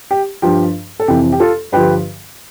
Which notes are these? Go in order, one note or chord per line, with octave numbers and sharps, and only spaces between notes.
G4
G2 F3 G4
A4
F2 C3 E3 G4
G4
F4 A4
G2 D3 F3 G4 B4